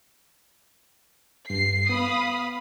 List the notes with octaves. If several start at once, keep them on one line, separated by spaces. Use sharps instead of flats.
G2 C7
B3 F5 B5 D#6